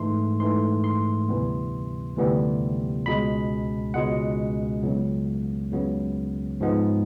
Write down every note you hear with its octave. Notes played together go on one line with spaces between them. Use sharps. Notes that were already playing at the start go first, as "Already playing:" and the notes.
Already playing: G#2 E3 A3 C6
G#2 E3 A3 C6
C6
D2 C3 E3 G3 B3
D2 C3 E3 G3 B3
C#2 B2 G#3 B5
C#2 B2 G#3 F#5
C#2 C#3 F#3 B3
C#2 C#3 F#3 B3
G#2 F3 G#3 B3